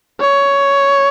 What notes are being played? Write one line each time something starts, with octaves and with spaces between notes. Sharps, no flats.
C#5